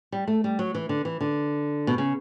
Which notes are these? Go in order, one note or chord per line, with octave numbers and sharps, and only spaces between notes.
G3
A3
G3
F#3
E3
D3
E3
D3
B2
C#3